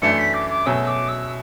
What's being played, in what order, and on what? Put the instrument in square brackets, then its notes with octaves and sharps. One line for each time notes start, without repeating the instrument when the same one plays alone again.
[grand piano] F#2 E3 A3 D4 [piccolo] C#7
[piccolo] B6
D6
D6
[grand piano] B2 F#3 A3 C#4 G#4 [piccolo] E6
[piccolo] D6
E6